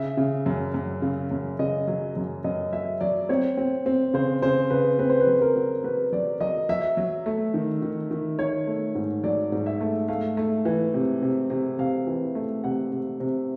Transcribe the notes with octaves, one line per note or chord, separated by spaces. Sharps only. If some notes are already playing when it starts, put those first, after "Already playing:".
Already playing: C#3 E5
C#3
F#2
F#2
C#3
F#2
C#3 D#5
F#3
F#2
F#2 D#5
F#3 E5
F#3 D5
C4 C#5
C4
C4
C#3 C5
C#3 C5
C#3 B4
C4 B4
C5
B4
F#3
A#4
F#3
F#3 B4
F#3 D5
F#3 D#5
F#3 E5
F#3
A3
D#3
D#3
D#3
D#3 C#5
A3
G#2
F#3 D5
G#2
E5
A3
A3 F5
A3
E3
C3
C3
C3
C3 F5
E3
A3
C3 F#5
C3
C3